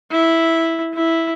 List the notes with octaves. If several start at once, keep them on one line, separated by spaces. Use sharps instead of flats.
E4
E4